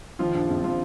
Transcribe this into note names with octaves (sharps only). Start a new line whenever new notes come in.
D#3 F3 F4
A#1 D4
A#1 C4
F3 F4